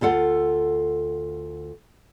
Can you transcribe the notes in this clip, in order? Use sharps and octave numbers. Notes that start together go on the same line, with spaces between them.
D2 F4 A4 F#5